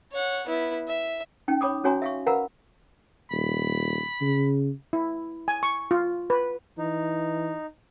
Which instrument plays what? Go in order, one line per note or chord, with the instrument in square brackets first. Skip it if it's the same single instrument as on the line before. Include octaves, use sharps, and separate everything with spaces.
[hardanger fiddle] C#5 F#5
B3 E4
E5
[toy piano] C#4 D#4 G5
C#5 B5 D6 D#6
C#4 F#4 C#5 G#5 A#5 C6
E5 F5 C#6
A#4 B4 F5 F#5 A#5 B5
[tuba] D#1 [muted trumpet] B5
[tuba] C#3
[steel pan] E4
G#5
C#6
F4
B4
[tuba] E3 [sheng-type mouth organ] D#4